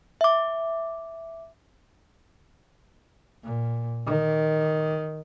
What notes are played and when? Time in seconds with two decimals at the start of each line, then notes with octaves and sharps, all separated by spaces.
0.21 E5 D6
3.44 A#2
4.06 D#3